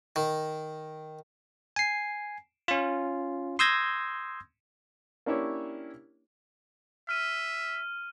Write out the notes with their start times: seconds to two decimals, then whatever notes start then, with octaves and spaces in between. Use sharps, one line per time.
0.16 D#3
1.76 G#5 C7
2.68 C#4 F4
3.59 C6 D#6 E6 G6 G#6 A#6
5.26 A#3 C#4 D4 E4 G4 C#5
7.09 E5 F6 D#7